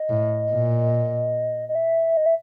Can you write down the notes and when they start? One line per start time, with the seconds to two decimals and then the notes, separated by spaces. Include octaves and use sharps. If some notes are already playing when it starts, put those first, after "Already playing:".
Already playing: D#5
0.10 A2
0.51 A#2
1.69 D#5
1.75 E5
2.17 D#5
2.26 E5